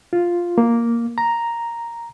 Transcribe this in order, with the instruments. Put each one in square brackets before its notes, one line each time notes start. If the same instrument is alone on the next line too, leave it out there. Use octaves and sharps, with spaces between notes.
[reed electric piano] F4
A#3
A#5